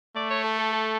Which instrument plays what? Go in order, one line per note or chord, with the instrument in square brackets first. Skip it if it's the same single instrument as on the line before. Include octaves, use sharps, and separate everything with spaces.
[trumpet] A3 [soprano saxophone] D5
[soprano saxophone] C#5
A4
A4
A4